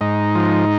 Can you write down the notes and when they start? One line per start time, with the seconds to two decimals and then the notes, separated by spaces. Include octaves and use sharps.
0.01 G#2 D#4
0.35 F3